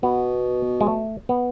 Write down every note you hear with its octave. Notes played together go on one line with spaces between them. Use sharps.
B2 B3
G#3
A3
B3